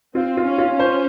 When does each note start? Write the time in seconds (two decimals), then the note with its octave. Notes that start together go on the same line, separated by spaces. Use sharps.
0.15 C4 F4
0.37 F4
0.44 C#4
0.58 F4
0.72 C#4
0.79 C5